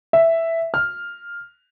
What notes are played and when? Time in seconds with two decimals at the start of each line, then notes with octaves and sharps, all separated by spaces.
0.13 E5
0.74 F6